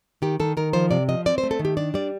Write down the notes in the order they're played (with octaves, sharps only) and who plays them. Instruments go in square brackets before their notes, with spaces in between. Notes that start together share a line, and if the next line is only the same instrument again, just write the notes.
[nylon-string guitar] D#3 G4
D#3 A4
D#3 A#4
F3 C5
C3 D5
F3 D#5
C4 D5
C5
A3
A4
D#3
G4
D4 D5
G3 D5